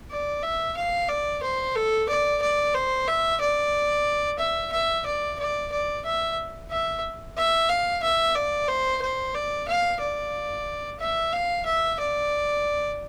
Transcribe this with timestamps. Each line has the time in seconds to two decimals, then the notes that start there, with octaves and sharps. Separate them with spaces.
0.11 D5
0.43 E5
0.76 F5
1.09 D5
1.43 C5
1.75 A4
2.08 D5
2.41 D5
2.74 C5
3.07 E5
3.41 D5
4.39 E5
4.72 E5
5.06 D5
5.39 D5
5.72 D5
6.05 E5
6.70 E5
7.37 E5
7.69 F5
8.02 E5
8.35 D5
8.68 C5
9.01 C5
9.34 D5
9.68 F5
10.00 D5
11.00 E5
11.32 F5
11.65 E5
11.99 D5